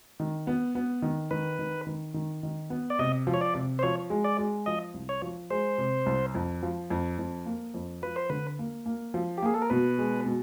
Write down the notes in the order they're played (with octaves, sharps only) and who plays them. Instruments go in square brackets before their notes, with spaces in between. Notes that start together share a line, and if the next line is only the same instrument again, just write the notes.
[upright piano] D#3
B3
B3
D#3
[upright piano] D#3 [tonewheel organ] B4
[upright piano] D#3
D#3
D#3
D#3
B3
[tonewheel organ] D5
[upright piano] C3 [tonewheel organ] D#5
[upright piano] F3
[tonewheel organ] C#5
D5
[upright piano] C3
[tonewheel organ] C5
[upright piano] F3 [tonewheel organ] C#5
[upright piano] G#3
[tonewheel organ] D5
[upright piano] G#3
[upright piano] F3 [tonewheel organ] D#5
[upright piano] C2
[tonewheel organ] C#5
[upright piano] F3
[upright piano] G#3 [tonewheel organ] C5
[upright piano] C3
C2
F2
F3
F2
F2
A#3
F2
[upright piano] F3 [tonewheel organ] B4
[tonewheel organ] C5
[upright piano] D3 [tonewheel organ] B4
[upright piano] A#3
A#3
F3
[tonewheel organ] G4
[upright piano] A#3 [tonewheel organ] G#4
[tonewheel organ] A4
A#4
[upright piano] B2 [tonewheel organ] B4
[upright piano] G#3
B2